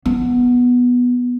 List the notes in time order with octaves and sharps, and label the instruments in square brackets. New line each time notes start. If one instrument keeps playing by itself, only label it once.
[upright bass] B3